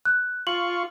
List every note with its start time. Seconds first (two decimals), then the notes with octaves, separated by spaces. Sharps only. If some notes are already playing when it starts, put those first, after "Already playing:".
0.05 F#6
0.47 F4 C#6 F#7